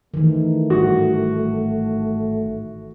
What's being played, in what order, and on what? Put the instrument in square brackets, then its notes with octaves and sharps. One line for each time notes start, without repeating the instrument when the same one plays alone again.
[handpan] D#3 E3 [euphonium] A3
[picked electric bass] G#1 A2 G3 [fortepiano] F#4